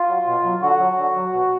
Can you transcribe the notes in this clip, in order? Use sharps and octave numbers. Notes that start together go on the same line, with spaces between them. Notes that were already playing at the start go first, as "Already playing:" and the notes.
Already playing: F4
F#3
B2
F#3
D3 F#4
F#3
D3
F#3
B2